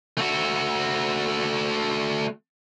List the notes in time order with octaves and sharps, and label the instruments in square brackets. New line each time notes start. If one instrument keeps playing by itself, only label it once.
[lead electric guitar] A3 F#4